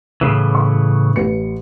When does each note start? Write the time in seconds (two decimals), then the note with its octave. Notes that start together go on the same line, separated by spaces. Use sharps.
0.21 A2 C#3 E3
0.55 C#6
1.16 A1 B4 C#7